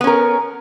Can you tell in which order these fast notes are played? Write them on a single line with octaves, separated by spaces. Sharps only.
B3 C#4 A#4